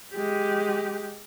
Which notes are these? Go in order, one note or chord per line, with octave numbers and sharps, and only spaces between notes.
G#3 G4